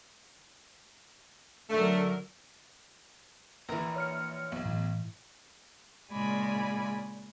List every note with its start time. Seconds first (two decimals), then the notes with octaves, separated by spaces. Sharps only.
1.70 D3 F#3 A3 A#4
3.69 A#1 E3 A#4 A#5
3.96 C#5 F6 C#7
4.52 B1
4.65 A2 E3
6.11 A#2 C#3 G#3 D5 G#5 B5